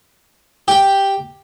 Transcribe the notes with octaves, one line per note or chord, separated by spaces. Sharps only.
G4 G5